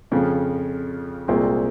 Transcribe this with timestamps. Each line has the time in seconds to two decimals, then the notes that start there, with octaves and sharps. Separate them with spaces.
0.12 F2 C#3 F3
1.28 C2 A#2 G#3 C4 F4